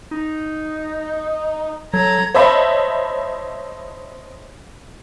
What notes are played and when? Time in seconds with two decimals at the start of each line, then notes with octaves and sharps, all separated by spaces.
0.11 D#4
1.94 F#3 A4 A#5 G#6
2.34 C5 C#5 D#5 E5 A5 B5